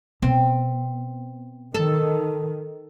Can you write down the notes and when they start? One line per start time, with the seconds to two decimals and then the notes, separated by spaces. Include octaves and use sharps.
0.22 B2 C4
1.74 D#3 A4